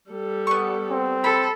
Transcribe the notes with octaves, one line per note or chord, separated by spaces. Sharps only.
G3 A4
B3 C#6
C4
A4 B5